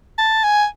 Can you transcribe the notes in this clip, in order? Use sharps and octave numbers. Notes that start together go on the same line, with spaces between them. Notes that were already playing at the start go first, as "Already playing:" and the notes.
A5
G#5